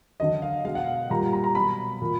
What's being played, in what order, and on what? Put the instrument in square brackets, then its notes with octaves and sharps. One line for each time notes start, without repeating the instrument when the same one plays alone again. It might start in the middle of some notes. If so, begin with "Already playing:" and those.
[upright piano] D3 F#3 D#5
F5
B2 G#3 F5
F#5
F5
A#2 G3 A#5
A#5
A#5
B2 F#3 B5
A#2